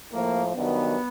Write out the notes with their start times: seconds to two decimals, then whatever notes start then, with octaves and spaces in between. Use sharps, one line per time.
0.11 A2 F3 A#3
0.54 G2 D#3 F#3 B3